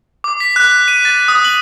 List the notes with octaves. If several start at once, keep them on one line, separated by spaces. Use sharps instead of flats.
D6
B6
F#6
F#6
D#7
A6
D#6
F#7